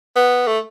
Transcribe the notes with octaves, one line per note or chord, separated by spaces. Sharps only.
B3
A3